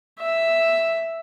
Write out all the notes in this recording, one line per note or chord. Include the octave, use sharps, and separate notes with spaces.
E5